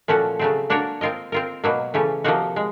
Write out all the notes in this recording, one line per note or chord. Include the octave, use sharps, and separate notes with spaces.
A#2 F3 A3 C#4 F#4
C#3 F#3 A3 C4
A#3 D4 F#4 A#4 C#5
C4 F4 A#4 D#5
C4 F4 A#4
B2 F#3 A#3
C#3 E3 A3 C#4
C3 F3 A#3 D#4 F#4
G#3